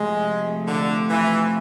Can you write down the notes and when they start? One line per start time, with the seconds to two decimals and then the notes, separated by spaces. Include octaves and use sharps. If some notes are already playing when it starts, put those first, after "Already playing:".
Already playing: C3 F3 G#3 A3
0.68 D3
1.09 E3